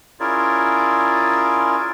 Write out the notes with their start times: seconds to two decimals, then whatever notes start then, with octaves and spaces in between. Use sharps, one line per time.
0.20 C#4 E4 F4 G#4 A#4 D5